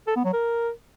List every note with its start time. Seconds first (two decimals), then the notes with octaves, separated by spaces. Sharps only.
0.07 A4
0.16 B3
0.25 F#3
0.33 A#4